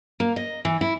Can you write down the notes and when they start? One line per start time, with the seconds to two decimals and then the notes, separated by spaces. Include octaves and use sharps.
0.20 A#3
0.36 D#5
0.65 E3
0.81 E4